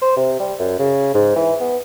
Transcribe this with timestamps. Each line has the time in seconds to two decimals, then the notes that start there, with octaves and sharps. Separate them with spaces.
0.01 C5
0.16 C3
0.39 G3
0.59 F#2
0.79 C#3
1.14 G#2
1.36 E3
1.60 B3